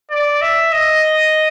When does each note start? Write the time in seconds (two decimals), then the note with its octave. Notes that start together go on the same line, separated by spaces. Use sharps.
0.11 D5
0.41 E5
0.72 D#5